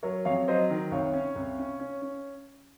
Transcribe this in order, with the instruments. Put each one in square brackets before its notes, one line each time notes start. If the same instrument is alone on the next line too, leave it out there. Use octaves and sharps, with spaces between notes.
[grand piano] F#3 [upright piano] A#4 C#5
[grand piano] F2 [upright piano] C#5 F5
[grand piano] F#3 [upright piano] C5 D#5
[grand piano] D#3
[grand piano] C2 [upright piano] C#5 F5
[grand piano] C#4
C2
C#4
C#4
C#4